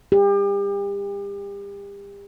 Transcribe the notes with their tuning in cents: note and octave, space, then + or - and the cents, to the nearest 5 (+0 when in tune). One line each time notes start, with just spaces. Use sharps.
G4 +35